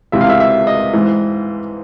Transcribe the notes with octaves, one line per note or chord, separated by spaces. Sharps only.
C#2 C3 E3 E5
F5
E5
E5
D#5
G#2 E3